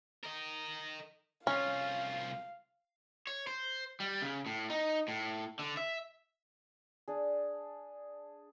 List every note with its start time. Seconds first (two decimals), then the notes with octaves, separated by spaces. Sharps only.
0.24 A#4 D#5
1.47 C2 C#4 F4 F5
3.27 C#5
3.47 C5
4.00 G3
4.22 C#3
4.46 A2
4.70 D#4
5.08 A2
5.59 D3
5.77 E5
7.08 D4 G#4